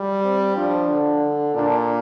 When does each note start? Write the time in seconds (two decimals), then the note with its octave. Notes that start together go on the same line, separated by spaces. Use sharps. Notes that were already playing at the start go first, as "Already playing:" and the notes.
Already playing: G3
0.23 C4
0.56 F3 D4
0.89 D3
1.55 A#2 D4